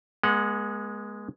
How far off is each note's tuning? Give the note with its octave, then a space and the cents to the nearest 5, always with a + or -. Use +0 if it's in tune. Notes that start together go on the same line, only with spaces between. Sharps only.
G#3 +0 B3 -45 F#5 -5